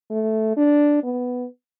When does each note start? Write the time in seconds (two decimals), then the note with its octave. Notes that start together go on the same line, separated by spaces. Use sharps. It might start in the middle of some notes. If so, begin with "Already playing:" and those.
0.10 A3
0.57 D4
1.03 B3